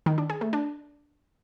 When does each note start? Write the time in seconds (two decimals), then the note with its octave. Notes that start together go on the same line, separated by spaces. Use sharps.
0.06 D#3
0.18 D4
0.30 G#4
0.41 A3
0.53 D4